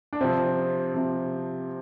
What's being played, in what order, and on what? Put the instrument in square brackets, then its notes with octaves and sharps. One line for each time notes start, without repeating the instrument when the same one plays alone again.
[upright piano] D4
C3 F3 C4
C3 F3